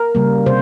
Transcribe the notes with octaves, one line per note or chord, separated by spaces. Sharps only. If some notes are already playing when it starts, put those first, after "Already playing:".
Already playing: A#4
C#3 G3 A#3
C3 C5